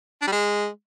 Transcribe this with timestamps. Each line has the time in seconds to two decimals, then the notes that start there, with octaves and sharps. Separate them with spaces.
0.22 D4
0.27 G3
0.32 G#3